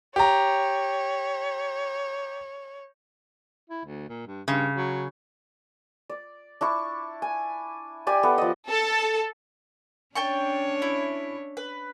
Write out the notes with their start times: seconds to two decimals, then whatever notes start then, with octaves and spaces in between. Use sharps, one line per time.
0.16 G4 C#5 A#5
3.70 E4
3.85 D2
4.09 A#2
4.27 G2
4.48 G2 C#3
4.75 F#3
6.09 D5
6.61 D4 E4 C#6
7.22 G#5
8.07 G4 D5 G#5
8.23 B3 E4 A4
8.38 F3 D#5
8.69 A4
10.15 C#4 D4 C#5 G5 A5 C#6
10.82 E4
11.57 B4